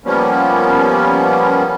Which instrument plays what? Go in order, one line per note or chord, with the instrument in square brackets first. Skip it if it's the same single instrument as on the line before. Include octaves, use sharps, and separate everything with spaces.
[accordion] F3 G3 A#3 B3 C#4